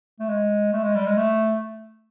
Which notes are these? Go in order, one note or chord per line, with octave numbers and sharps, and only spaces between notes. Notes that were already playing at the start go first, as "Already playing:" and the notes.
A3
G#3
A3
G#3
G3
G#3
A3